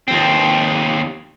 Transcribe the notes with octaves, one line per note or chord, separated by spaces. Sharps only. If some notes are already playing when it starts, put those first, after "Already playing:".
D#2 C4